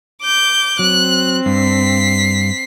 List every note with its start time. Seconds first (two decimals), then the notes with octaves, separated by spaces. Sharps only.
0.22 D6 G6
0.79 F#3 C4 F#6
1.46 G2 B6 C7